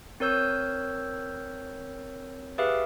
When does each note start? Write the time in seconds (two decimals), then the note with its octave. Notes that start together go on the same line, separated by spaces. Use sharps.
0.20 C4 A#4 C#5 E6 G6
2.58 G4 G#4 B4 E5 F5